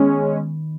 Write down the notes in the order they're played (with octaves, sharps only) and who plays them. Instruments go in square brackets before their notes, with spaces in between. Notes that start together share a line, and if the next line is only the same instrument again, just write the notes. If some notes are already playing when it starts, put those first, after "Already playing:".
Already playing: [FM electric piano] D#3 B3 [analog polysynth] G#3 C#4